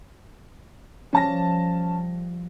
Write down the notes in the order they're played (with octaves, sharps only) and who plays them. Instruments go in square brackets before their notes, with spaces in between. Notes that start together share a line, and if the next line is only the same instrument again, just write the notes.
[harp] F3 G3 [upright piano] C#4 A5 A#6